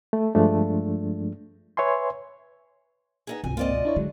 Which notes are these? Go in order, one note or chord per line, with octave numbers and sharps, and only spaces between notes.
A3
G2 F3 G#3 A3 D4
B4 C#5 E5 G#5 C6
B3 D#4 G#4
G#1 C#2 C3 G#5
A#3 C4 F4 D5 D#5
B2
D4 E4 C#5
D3 F#3 G#3